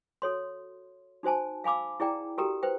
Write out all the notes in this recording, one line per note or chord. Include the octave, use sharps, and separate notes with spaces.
F#4 A4 C#5 C6
D#4 F#4 C5 G#5 A5
F5 G#5 B5 D6 E6
E4 G#4 D5 G5 A#5
F#4 G4 A4 A#4 G5 A#5
B4 C5 G5